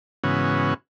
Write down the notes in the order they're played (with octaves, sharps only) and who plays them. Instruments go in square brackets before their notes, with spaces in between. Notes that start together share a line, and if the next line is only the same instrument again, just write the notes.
[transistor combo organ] G#2 C#3 E3 B3 C#4 F#4